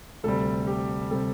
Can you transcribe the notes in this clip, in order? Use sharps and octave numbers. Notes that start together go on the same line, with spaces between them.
D2 C3 G3 A4
G4
C3 G3 A4